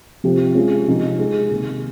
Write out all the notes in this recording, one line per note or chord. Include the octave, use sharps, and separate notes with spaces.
C3 F3 C4 G4
G#3 C#4 F4 G#4
C3 F3 C4 D#4 G4
G#3 D#4 G#4
C3 D#3 A#3